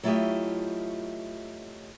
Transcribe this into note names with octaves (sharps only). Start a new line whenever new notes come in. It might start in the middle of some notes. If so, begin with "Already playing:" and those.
F#3 A3 E4 F4 G4 D#5